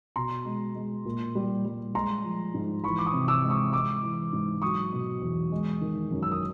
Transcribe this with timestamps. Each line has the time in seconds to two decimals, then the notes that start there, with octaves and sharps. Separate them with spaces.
0.16 B2 A#5 C6
0.45 G#3
0.75 G#3
1.05 A#2
1.35 G3
1.65 G3
1.94 G#3 A#5 C6
2.24 F3
2.54 G#2
2.84 E3 B5 C#6
2.99 D6
3.06 C#6 D#6
3.13 C3
3.28 D6 E6
3.43 G#3
3.50 C#6 D#6
3.73 G#3 D6 E6
4.03 E3
4.33 G#2
4.62 F#3 C#6 D#6
4.93 B2
5.22 E2
5.52 G#3
5.81 D#3
6.11 F#2
6.23 E6
6.32 D#6